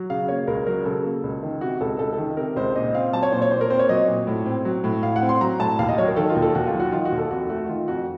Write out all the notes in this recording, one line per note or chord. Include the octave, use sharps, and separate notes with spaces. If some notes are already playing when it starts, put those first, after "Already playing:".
Already playing: F#3
C#3 F5
A#3 C#5
C#2 A#4
F#3 A#4
C#3 A4
A#3
C#2
D#3
C3 F#4
C#2 A4
C#2 A4
A4
D#3
C3 A#4
C#2 C5
A#2 D#5
C4 F5
F#3 A5
C#5
A#2 C5
C#5
A#2 C5
A#4
C4 C5
C#5
F#3 D#5
A#2
A2
C4
F#3
A2
A2 F5
F#5
C4
C6
F#3 A#5
A2 A5
D#2 F5
D#5
F#3 C#5
A#4
D#3 A4
F4
D#2
A4
D#2 F#4
F4
F#3
F#4
D#3 F4
F#4
D#2
A4
F2 F#4
A3 F#4
D#3 F4
F2 F#4